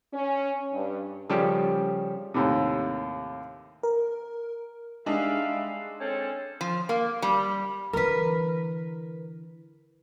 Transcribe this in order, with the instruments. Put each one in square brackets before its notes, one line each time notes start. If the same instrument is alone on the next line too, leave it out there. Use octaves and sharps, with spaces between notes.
[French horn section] C#4
G2
[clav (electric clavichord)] C#3 F3 G3 C#4 G4 A4
[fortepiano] D#2 A2 C3
[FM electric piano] A#4
[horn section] G3 E5 F5 [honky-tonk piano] G#3 D4 D#4
[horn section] C4 C#4 A4
[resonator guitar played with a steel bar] F3
A#3
G3
[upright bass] D3 E3 [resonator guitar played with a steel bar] A#4 B4